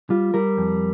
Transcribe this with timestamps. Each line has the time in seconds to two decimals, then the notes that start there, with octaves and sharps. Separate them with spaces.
0.10 G3 F4
0.34 G3 A#4
0.58 F2